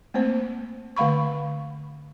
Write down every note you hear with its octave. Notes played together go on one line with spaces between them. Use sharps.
A3 A#3 C4 C5
D3 A3 F5 B5 C#6